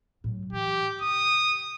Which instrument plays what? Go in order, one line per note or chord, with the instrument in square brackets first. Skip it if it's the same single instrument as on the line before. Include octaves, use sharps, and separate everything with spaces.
[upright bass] A2 F#3
[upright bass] E3 [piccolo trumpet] G4
[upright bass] F1 [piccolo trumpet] D#6